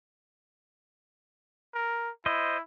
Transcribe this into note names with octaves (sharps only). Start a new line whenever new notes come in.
A#4
E4 C5 D#5